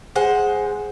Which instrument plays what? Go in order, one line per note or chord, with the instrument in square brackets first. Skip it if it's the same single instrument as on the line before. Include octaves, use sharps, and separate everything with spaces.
[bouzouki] G#3 C5 F#5